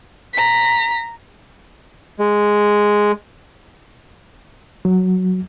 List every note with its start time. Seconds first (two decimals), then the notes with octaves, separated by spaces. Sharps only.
0.34 A#5 B6
2.19 G#3
4.85 F#3